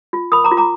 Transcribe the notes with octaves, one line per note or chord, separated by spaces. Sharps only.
F4
A#4 B5 D#6
A#5 D6
F4
A#5 D6